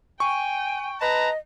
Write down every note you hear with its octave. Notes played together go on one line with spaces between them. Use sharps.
G5 G#5 C#6
B4 D#5 A5 A#5